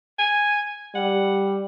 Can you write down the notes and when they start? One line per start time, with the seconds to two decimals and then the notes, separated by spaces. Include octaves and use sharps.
0.19 G#5
0.95 G3 F#5